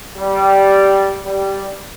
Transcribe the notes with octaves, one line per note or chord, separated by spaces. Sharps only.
G3
G3